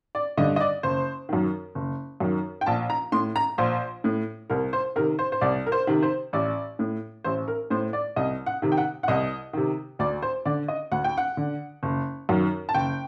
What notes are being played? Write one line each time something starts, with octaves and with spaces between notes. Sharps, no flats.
D5
G2 D3 D#5
D#5
D5
F#1 C5
F#2 D#3
F#1
F#2 D#3
G5
A#1 A5
A#5
A2 C6
A#5
A#1 C5
A2
C2 A#4
C5
C3 D#3 A#4
C5
C5
C2 D5
A#4
C5
C3 D#3
C5
A1 D5
A2
A1 C5
A#4
A2 C5
D5
C2 D#5
F#5
C3 D#3
G5
F#5
F#5
C2 D#5
C3 D#3
D2 D5
C5
D3 D5
D#5
D2 F#5
G5
F#5
D3
F#1
F#2 D#3
A5
F#1 G5